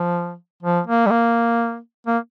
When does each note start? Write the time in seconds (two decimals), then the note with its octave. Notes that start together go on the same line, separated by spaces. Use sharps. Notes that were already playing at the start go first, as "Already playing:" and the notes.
Already playing: F3
0.63 F3
0.87 A#3
1.06 G3
1.11 A#3
2.07 A#3